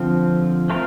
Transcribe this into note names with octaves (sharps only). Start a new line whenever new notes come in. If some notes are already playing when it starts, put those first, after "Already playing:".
Already playing: D3 F3 C4
A3 C4 F4 A#4